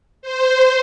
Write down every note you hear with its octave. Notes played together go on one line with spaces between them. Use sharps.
C5